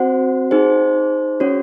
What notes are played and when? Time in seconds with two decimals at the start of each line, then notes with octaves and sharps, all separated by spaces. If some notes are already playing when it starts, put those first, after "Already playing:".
Already playing: C4 F#4 C5 F#5
0.51 D#4 G#4 C5
1.40 C#4 F#4 C#5